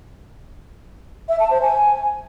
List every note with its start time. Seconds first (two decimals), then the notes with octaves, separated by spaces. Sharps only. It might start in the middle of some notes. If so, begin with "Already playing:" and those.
1.29 E5
1.40 A5
1.51 C5
1.62 G#5